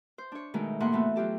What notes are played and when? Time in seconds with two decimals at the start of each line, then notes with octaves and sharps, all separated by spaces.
0.18 C5
0.32 D4 C#5
0.54 B2 D#3 G#3 A3
0.80 A2 C3 A#3 E4 F#5 C6
0.92 E3 A3 B3
1.16 F#3 F4 G4 A4